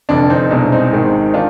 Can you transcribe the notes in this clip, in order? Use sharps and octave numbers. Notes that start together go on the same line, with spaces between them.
F1 F2 D3 D4
C4 D#4
C2 B2 G#3 D4
C4 D#4
G#1 G#2 D#3 G#3
D#3 D4 F4